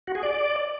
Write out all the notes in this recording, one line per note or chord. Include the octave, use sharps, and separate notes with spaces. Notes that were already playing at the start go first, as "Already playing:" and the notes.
F#4
G#4
D5